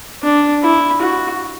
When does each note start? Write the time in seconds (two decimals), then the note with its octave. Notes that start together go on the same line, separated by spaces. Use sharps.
0.23 D4
0.63 E4
1.01 F#4